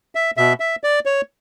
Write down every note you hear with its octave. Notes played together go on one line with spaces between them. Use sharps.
E5
B2 E5
E5
D5
C#5